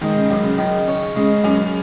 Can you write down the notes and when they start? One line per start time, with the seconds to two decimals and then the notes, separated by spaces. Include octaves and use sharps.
0.01 D#3 G#3
0.16 C#3
0.31 F#2
0.43 C#3
0.58 D#3
0.88 C#4
1.16 C#3 G#3
1.44 F#2 C#4